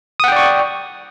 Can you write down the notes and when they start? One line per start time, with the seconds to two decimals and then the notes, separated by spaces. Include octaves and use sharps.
0.20 D#6
0.24 F#5
0.28 G5
0.32 D5
0.36 C#6